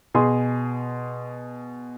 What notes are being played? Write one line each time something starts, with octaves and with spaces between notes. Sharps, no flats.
B2 G#4 C6